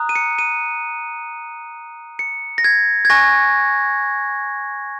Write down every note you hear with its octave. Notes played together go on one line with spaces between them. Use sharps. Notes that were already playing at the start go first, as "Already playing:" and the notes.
Already playing: A#5 D#6 F#6
D#7
C#7
D#7
C#7
A#6
G#6
G#6
G#5 C#6 F#6 A#6